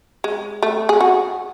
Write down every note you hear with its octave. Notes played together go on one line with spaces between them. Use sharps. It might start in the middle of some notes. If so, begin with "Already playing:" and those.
G#3
A3
G#4
F#4